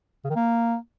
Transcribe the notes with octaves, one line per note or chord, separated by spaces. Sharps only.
C#3
D#3
A#3